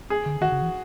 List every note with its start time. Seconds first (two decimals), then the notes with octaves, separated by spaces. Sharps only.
0.10 G#4
0.26 D3
0.41 D#3 F#4
0.52 C#3
0.62 E3